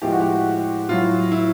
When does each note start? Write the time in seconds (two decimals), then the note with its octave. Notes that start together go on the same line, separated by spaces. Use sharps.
0.02 A2 F3 G#3 G4
0.12 F#4
0.21 G4
0.89 A2 F#3 F4
1.32 E4